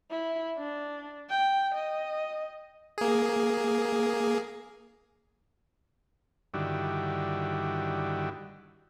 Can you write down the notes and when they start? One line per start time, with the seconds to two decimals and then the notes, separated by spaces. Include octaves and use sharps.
0.11 E4
0.58 D4
1.30 G5
1.75 D#5
2.98 A#3 G#4
6.54 G2 D3 D#3 G3 E4 F#4